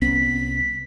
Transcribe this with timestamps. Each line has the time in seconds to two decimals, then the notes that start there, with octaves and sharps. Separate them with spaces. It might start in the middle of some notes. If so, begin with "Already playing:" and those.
0.02 C2 B3 C#4 B6